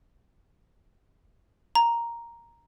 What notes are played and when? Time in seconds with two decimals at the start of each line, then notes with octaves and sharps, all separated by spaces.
1.75 A#5